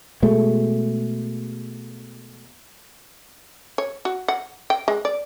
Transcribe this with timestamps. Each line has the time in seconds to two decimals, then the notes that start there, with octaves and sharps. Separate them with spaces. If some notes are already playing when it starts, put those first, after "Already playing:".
0.22 B2 G#3 A3
3.78 C#5
4.05 F#4
4.28 F#5
4.70 G5
4.88 G#3
5.05 D5